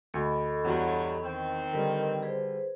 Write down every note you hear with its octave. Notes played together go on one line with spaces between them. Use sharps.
D2 A4 D#5 B5 C#7
E2 G2 F#3 A#5
D#3 C4
D3 G3 A#4 B4 D#5
G#4 B4 C5